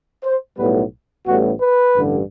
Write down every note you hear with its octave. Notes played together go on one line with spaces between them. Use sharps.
C5
B1 A2 G3 B3 B4
A1 A2 G3 B3 F#4
B4
A1 G2 D3